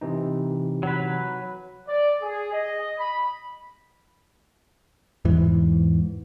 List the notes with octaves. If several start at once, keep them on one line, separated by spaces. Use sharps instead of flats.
C3 E3 D#4
F#3 B4
D5
G#4
D#5
B5
E2 G#2 E3